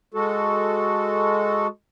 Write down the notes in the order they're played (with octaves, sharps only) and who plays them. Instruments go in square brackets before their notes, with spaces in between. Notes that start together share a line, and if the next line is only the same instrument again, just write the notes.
[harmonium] G#3 F#4 A4